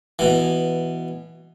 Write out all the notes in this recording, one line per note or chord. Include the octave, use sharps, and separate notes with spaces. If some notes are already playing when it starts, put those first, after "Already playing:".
B2 E3